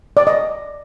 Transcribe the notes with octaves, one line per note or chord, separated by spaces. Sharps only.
D5
D#5